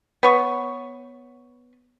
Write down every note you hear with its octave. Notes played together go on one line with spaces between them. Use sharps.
B3 C#5 C#6